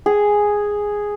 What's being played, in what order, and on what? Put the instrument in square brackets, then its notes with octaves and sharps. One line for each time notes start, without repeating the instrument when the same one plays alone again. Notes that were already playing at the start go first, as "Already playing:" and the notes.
[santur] G#4